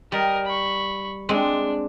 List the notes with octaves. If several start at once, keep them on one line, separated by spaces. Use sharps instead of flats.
G3 A#4 D#5
B5 C#6
G#3 C4 D4